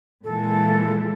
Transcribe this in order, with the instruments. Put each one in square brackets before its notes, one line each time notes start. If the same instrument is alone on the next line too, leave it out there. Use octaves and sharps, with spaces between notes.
[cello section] A#2 E3 G#3 [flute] A4